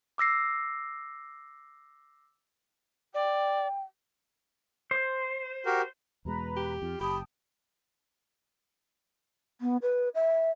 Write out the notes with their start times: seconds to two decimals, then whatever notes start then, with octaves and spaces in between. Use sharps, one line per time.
0.18 D6 E6 A#6 C7
3.14 D5 G5
4.91 C5
5.66 F#4 G4 A#4
6.25 E2 B2 G#3 B4 A#5 B5
6.57 G4
6.82 F2 F4
7.01 F#1 G4 G5 A5 B5 D#6
9.61 B3
9.82 B4
10.15 E5